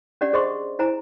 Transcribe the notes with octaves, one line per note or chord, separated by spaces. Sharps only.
C#4 D4 G4 D5 F#5
G#4 C5 D#5 C6 C#6
E4 C5 G#5 A#5